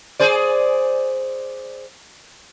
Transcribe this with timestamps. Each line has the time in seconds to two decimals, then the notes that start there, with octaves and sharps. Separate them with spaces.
0.20 G#4 C5 D5